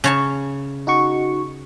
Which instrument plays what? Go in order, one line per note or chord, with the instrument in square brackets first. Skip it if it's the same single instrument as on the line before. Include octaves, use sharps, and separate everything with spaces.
[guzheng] C#3 C#5 A5
[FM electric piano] D#4 F#4 C#6